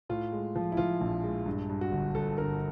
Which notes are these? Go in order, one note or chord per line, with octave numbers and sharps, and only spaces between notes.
A2 F4
G#3
F3
E4
F3 F4
A#1
G#3
G2
G2
F#4
G1
G1 A4
G1 A#4